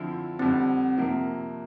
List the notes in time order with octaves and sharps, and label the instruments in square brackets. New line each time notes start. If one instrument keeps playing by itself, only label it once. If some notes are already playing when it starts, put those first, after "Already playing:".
Already playing: [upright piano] D3 F3 C4 E4
[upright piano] F2 D3 G3 [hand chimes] C4
[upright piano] C3 F3 A#3